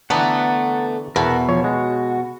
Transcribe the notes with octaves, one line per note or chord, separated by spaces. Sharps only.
D3 E3 A3 B3 F#5 A5 A#5
E2 B2 A#4 E5 F#5
F3 C#5
G#3 F#4